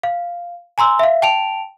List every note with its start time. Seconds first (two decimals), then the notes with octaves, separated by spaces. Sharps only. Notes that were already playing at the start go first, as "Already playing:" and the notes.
0.03 F5
0.78 G#5 A#5 C6 E6
0.99 E5 F5
1.22 G5 A5 D7 F7